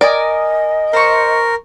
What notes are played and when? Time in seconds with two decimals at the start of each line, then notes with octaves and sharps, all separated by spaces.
0.01 A#4 D5 D#5 G#5 D#6
0.93 A#4 C5 C#6